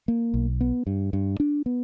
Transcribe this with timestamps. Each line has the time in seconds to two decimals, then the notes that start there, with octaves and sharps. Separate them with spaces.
0.08 A#3
0.34 B1
0.61 B3
0.87 G2
1.13 G2
1.40 D4
1.66 B3